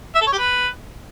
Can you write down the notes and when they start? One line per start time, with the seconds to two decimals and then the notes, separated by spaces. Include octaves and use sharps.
0.15 E5
0.21 A4
0.27 C#5
0.33 G4
0.38 B4